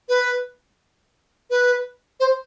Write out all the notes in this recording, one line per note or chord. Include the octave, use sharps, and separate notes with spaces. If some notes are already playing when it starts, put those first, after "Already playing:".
B4
B4
C5